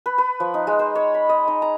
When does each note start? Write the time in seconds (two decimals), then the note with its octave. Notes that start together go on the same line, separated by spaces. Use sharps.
0.06 B4
0.18 B4
0.40 F3
0.54 D#4
0.67 G#3
0.79 C5
0.95 C#5
1.14 B5
1.29 D#5
1.48 D#4
1.62 A#5